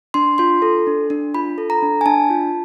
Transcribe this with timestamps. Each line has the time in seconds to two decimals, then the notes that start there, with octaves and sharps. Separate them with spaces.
0.14 D4 C6
0.38 F4 C6
0.62 A4
0.87 D4
1.10 D4
1.35 F4 B5
1.58 A4
1.70 A#5
1.83 D4
2.01 G#5
2.06 D4 A5
2.30 F4